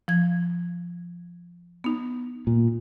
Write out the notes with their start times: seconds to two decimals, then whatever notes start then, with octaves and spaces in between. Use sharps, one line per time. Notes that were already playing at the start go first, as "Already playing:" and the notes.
0.08 F3 G#6
1.84 B3 D#4
2.47 A#2